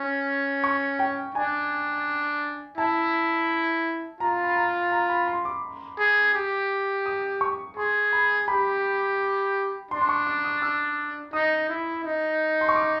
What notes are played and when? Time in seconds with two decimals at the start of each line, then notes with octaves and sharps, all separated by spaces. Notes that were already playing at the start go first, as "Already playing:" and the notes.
Already playing: C#4
0.64 C#6
0.99 G5
1.35 D4 G#5
2.78 E4 A5
4.20 F4 A#5
4.44 B5
4.56 A#5
4.92 A#5
5.09 B5
5.28 C6
5.45 D6
5.99 G#4
6.34 G4
7.06 D#6
7.41 C#6
7.77 G#4 C6
8.13 B5
8.48 G4 B5
9.91 D4 C6
10.02 C6
10.09 C#6
10.27 D6
10.44 D#6
10.62 E6
11.33 D#4 D#6
11.69 E4
12.05 D#4
12.61 C6
12.69 C#6
12.76 D6